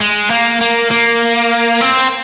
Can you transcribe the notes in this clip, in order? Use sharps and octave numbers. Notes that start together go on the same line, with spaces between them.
G#3
A#3
A#3
A#3
C4